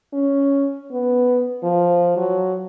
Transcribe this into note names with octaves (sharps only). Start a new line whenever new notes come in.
C#4
B3
F3
F#3